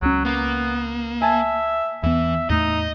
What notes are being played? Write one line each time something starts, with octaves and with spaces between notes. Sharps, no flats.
C#2 F#3 C#4
A#3 B3
E5 G#5 A5
E2 E3 B3 E5
E2 A2 A3 D#4 D#5